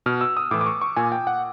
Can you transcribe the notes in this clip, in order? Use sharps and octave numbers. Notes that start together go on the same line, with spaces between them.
B2 F6
E6
D#6
A2 E3 D6
D6
C#6
C#6
A#2 G#5
G5
F#5